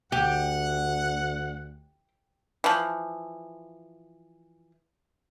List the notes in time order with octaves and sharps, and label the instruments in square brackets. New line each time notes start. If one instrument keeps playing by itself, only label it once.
[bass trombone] D2 [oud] G4 [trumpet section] F#5
[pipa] E3 F3